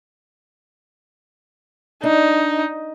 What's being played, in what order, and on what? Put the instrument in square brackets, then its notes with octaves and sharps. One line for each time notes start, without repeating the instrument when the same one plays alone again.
[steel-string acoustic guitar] D4 [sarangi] D#4